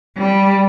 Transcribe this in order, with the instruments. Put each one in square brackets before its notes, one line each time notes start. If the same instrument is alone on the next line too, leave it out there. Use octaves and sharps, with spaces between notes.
[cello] G3